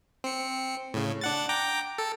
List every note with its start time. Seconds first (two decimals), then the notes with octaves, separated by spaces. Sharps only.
0.24 C4 C#7
0.94 A2 C#3
1.21 D4 F#5 A6
1.49 G5 A#5 D6
1.98 A4